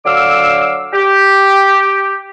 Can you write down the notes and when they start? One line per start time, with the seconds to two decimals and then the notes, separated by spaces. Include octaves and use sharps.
0.05 D3 F#3 F5 D6 E6
0.93 G4